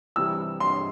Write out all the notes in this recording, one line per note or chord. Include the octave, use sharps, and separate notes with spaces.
C3 E3 G3 E6
C6